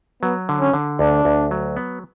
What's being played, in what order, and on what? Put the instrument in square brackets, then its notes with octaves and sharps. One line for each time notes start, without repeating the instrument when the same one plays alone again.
[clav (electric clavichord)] F#3 [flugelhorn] B3
[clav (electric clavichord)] D3
[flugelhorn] C#4
[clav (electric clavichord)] D3
[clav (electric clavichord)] D2 [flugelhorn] D4
[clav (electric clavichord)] D2
F#3
B3